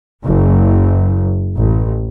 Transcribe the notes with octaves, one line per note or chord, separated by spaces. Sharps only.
F#1
A1